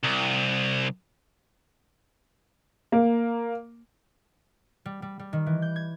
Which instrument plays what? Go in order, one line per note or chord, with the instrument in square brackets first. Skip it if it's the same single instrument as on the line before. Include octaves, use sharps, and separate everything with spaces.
[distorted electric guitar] C2
[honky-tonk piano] A#3
[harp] G3
G3
G3
D#3
E3
G6
G#6